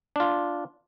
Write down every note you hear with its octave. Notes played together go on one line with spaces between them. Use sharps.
D4 F4